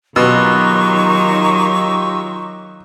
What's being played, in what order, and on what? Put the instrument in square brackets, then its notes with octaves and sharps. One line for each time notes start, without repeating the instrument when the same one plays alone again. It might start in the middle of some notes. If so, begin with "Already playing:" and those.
[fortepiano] B2 [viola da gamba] D#3 F#3 D#4 [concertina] F4 G4 E6 [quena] C#6